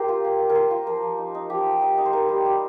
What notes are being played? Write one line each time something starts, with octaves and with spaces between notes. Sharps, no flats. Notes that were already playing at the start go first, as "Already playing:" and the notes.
Already playing: G4 A#4 C5
F4
A#3
A#3
A#4
F4 C5
F4
F3 A#4
F3
D#4
D#4
F3 G4
F3
D#4
D#4
C5
D#4 A#4
G3
G3